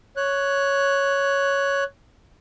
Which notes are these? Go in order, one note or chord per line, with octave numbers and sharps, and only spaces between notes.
C#5 F#6